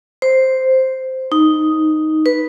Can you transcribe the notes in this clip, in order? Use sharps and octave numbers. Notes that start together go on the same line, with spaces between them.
C5
D#4
B4